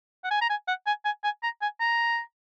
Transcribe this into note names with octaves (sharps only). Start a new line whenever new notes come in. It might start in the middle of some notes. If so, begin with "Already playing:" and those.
F#5
G#5
A#5
G#5
F#5
G#5
G#5
G#5
A#5
G#5
A#5